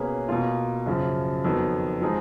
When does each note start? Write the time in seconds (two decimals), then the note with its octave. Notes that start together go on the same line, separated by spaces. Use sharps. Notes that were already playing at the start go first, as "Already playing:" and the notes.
Already playing: B2 A#3 C#4 G#4 B4
0.29 B2 A#3 F4
0.86 F#2 C#3 F3
1.44 F2 D#3 F#3 B3
2.01 F3 G#3 D#4 G#4